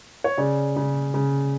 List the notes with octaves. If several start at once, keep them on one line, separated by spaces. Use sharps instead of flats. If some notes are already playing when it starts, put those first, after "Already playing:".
C#5
C#3 D5
C#3
C#3